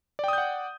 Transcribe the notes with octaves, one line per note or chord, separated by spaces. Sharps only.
D5 F#5 G5 D#6 G6